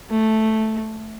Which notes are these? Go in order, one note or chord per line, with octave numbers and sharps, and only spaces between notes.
A3